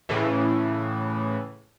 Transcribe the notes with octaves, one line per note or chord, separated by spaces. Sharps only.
A2 C#3 E3